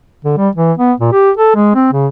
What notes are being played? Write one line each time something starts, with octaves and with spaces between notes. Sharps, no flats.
D3
G3
E3
B3
A#2
G4
A4
G#3
C4
C#3